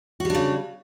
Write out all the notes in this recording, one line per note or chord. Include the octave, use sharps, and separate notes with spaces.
C#3 G3 D4 F#4